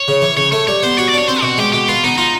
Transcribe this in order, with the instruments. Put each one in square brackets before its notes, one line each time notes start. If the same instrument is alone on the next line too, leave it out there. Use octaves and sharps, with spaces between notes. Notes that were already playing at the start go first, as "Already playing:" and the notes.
Already playing: [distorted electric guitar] C#5
[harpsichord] C#3
E3
[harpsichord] C#3 [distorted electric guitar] C#5
[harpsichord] A3 [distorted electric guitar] C#5
[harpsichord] G3 [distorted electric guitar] C#5
[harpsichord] B3 [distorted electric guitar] C5
[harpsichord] F#4 [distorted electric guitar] C#5
[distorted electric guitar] D5
[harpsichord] D4 [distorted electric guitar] C#5
[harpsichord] C4 [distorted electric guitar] C5
[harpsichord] B2 [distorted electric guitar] F#4
[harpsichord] G#3 [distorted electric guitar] G4
[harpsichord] B2 [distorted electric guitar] G4
[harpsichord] B3 [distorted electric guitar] F4
[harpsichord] B3 [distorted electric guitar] D#4
[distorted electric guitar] D#4 [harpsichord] F4